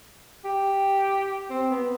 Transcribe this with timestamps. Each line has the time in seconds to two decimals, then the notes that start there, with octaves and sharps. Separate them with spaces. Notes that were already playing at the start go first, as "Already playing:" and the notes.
0.44 G4
1.50 C4
1.70 B3